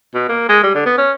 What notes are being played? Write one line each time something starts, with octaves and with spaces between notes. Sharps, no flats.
B2
A#3
G#3
G3
D3
B3
C#4